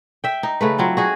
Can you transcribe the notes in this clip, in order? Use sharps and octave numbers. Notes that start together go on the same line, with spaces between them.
E5 G5
D#4
C#3 A3 B4
F#3 C4 F4
F#4 G#4 D#5